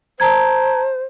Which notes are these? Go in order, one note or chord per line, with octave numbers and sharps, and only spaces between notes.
C5 A5 A#5 G#6